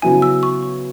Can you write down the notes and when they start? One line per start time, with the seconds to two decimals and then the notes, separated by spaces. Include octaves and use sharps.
0.02 C#3 F#3 B3 E4 G#5
0.22 E6
0.43 C#6
0.62 C#6